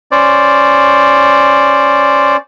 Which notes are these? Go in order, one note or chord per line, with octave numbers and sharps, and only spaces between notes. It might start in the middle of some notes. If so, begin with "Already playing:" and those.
C#4 C5 D5